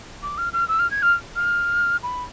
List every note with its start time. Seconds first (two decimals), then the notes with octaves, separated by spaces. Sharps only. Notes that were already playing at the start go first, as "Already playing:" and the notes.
0.23 D6
0.38 F6
0.53 F6
0.68 E6
0.79 F6
0.91 G#6
1.02 F6
1.36 F6
2.03 B5